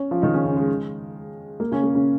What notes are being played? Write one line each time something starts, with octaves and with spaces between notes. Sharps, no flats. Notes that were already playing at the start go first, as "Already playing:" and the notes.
Already playing: C#4 C#5
F3 F4
D#3 D#4
C#3 C#4
C#3 C#4
G#3
A#3
C#3 C#4
A#3
C#3 C#4